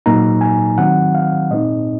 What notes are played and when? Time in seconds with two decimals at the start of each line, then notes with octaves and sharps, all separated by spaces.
0.06 A#2 F#3 A#3 D#4 A#5
0.41 G#5
0.78 D#3 F#3 C4 F#5
1.15 F5
1.51 A#2 G#3 C4 D#4 D#5